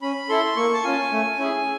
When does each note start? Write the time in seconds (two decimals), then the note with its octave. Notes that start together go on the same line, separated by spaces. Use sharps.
0.02 C#4 B5
0.29 E4 A4 C6
0.56 A#3 C#6
0.73 A5
0.84 C#4 F4 G#5
1.11 A3
1.38 C#4 E4 G#4